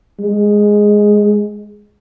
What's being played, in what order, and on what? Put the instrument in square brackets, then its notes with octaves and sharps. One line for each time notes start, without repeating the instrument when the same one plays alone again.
[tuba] G#3